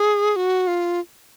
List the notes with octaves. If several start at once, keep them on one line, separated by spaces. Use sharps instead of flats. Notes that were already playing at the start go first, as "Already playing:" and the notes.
Already playing: G#4
F#4
F4